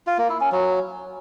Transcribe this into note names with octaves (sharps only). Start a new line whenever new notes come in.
F4
A#3
E4
C#4
F#3